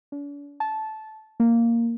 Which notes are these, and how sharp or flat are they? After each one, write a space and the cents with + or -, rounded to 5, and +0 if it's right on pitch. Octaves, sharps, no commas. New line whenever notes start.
D4 -45
A5 -15
A#3 -5